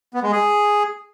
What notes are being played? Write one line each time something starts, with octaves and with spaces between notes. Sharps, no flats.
B3
G#3
G#4